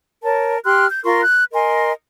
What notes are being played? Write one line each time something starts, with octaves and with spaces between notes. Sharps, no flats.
A#4 C#5 A5
G4 C6 F6 F#6
G6
F4 A#4 C6 C#6
F#6
A#4 D#5 G#5 C6